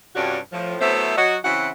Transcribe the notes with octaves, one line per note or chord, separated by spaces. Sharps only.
G2 C3 C#4 D4 F4 F#4
A2 F3
F#3 A3 B3 E4 C5
F#3 F#4 D#5
C#3 E3 C4 E4 F#5